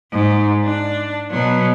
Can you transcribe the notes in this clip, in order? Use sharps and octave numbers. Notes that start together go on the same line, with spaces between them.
G#2
D4
B2 F#3